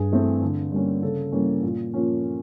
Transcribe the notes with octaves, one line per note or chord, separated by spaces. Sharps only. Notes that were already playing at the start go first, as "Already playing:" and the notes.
Already playing: G2 G#4
E3 A3 C4
D3
G3 A#3 C#4
C#3 A4
E3 G3 A#3 C#4
A#2
F3 A#3 C#4